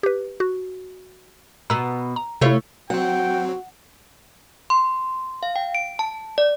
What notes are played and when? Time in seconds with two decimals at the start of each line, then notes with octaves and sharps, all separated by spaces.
0.03 G4 B4
0.40 F#4
1.70 B2 B3 A#5 E6
2.16 A#5
2.41 C3 A3 E4 F4 C#5
2.90 F#3 C4 F#4 F#5 G5
4.70 C6
5.43 F5
5.56 G5
5.75 D7
5.99 A5
6.38 D5